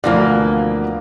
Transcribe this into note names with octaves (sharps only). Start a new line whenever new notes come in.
D2 B2 E3 F3 A#3 D5